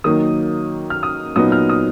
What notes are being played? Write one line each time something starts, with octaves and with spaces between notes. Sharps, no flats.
D#3 F#3 A#3 D#4 D#6
F6
D#6
A#2 F#3 B3 D#4 D#6
F6
D#6